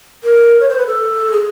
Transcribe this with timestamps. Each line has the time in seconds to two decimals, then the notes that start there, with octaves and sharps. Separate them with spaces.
0.24 A#4
0.60 C#5
0.69 C5
0.78 B4
0.87 A4
1.32 G#4